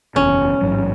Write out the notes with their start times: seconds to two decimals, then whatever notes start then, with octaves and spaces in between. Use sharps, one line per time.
0.16 F#1 E2 B2 C#4
0.61 A1 G#2 F#3